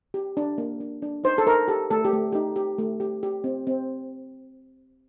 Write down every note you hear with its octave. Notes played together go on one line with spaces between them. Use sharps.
G4
D4
A#3
D4
D4
D#4 C5
A4
D#4 A#4
G4 A4
A3 A4
G4
A3
D#4 G4
G4
A3
G4
G4
C4
C4